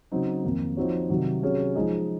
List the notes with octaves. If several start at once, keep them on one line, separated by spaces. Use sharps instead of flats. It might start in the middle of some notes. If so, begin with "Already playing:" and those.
C#3 F#3 C4 D#4
F2 D#3 A#3
F3 C4 D#4 F#4 C#5
C3 D#3 F#3
C3 F#3 C#4 G#4 C#5
F3 G#3 D#4 G#4 D#5